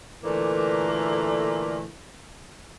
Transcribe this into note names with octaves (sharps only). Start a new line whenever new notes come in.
A#2 D3 E3 A3 A#3